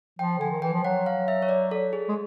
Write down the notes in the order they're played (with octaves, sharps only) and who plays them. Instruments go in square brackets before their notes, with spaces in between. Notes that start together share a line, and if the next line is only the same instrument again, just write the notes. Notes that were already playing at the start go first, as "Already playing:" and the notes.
[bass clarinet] F3 [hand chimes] G5
[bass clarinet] D3 [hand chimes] G#5
[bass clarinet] D#3
[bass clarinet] E3 [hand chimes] G5
[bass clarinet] F3
[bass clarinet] F#3 [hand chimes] F#5
[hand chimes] F5
E5
C#5
D5
A4
G#4
[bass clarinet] G#3